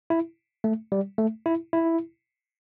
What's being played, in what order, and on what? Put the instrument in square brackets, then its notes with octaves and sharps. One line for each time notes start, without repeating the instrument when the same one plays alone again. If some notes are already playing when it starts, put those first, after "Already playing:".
[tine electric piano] E4
A3
G3
A3
E4
E4